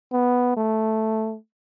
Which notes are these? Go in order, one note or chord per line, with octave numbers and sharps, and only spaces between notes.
B3
A3